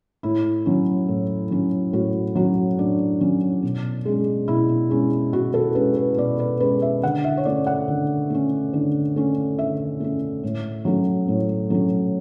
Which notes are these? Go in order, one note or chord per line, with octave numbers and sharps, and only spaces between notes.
A2 E4
F#3 C#4
A2
F#3 C#4
A2 F#4
F#3 C#4 F#4
A2 D4
F#3 C#4
B2
G#3 C#4
B2 E4
G#3 C#4
B2 F#4
A4
G#3 C#4 B4
B4
B2 D5
B4
G#3 C#4 B4
E5
D3 F#5
E5
C#5
A3 C#4 D5
F#5
D3
A3 C#4
D3
A3 C#4
D3 E5
A3 C#4
A2
F#3 A3 C#4
A2
F#3 A3 C#4